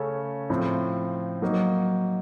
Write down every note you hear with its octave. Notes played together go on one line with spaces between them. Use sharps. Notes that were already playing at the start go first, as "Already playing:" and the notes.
Already playing: C#3 A3 C#4 A4 C#5
A2 F3 C4
F#3 A#3 D#4